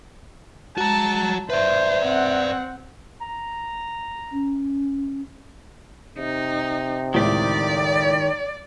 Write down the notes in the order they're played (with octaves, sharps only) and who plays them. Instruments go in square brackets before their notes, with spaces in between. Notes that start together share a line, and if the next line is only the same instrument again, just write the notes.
[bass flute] G#3 [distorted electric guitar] F#4 A#5 [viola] A5
[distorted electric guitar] B4 D5 [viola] C5 [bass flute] E5
[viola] C4 F#5
[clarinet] A#5
[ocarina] C#4
[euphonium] C3 [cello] D#4
[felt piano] C#2 A2 [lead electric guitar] D#3 G4 [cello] D5